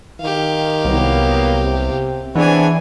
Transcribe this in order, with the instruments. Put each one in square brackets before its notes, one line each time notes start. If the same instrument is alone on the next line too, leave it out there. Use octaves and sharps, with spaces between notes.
[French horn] D#3 [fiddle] G4 F5
[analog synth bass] C2 [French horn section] F#3 A#3 B3
[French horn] C3
[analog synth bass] E3 [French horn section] B3 C4 D4 [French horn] G#4 [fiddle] C#5 G#5